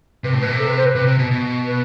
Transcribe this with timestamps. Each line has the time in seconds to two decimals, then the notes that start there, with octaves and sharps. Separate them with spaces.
0.24 C3 B4
0.34 A2
0.42 B2 B4
0.51 C3
0.60 A4
0.68 B4
0.78 C5
0.86 B4
0.95 C3
1.07 C3
1.19 B2
1.31 B2
1.66 B4